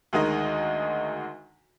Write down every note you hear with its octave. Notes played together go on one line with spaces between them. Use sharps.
D2 D#3 G#3 D#4 D#5